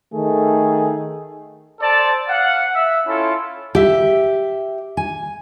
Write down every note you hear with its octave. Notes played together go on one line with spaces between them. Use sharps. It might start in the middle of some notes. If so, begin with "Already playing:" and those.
D#3 A3 G#4 A4
A4 C5 D5 A5
F5 F#5
E5
C#4 E4 F4 A4
G4 E5
G#5